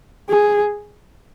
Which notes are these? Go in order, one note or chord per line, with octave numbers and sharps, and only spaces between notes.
G#4